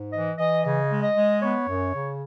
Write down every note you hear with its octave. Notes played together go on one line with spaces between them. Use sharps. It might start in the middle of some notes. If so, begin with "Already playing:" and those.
Already playing: G#2
E3 D#5
E3 D#5
C#3 D#5
G#3
D#5
G#3
B3 C#5
F#2
C#3